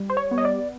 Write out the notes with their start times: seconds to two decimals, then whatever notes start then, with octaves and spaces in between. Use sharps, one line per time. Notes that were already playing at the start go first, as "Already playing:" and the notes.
Already playing: G3
0.10 C5
0.17 C#5
0.31 B3
0.38 D#5
0.45 D5